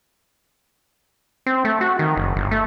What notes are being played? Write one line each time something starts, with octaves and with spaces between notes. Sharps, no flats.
C4
A3
F#4
D#3
F#1
G1
A3